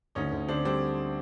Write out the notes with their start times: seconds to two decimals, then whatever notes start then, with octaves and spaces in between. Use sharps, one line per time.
0.15 D2 C#4 D#4
0.32 D2
0.48 D3 C4 D4
0.65 G3 C4 D4